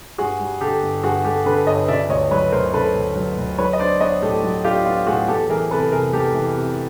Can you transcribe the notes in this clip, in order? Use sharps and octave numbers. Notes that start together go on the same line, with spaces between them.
G2 F#4 G#4
G3
D3 G4 A4
G1
G2 F#4 G#4
G3 G4 A4
D3 A4 B4
G1 C#5 D#5
C#3 D5 E5
D2 C#5 D#5
F#3 B4 C#5
D2 A#4 C5
C#3 A4 B4
D2
F#3
D2
F#3 B4 C#5
D#5
D4 C5 D5
B3 C#5 D#5
A2 G4 A4
F#3
D4 F4 G4
B3 F4
A2 F#4 G#4
E2 G4 A4
E3 G#4 A#4
C3 A4 B4
F1 G#4 A#4
E2 G4 A4
E3
C3